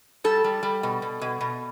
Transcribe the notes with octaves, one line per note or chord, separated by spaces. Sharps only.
G3 A4
G3
G3
B2
B2
B2
B2